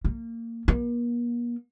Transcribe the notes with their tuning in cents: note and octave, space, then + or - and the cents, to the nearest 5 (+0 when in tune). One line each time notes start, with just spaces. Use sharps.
A#3 -20
A#3 +40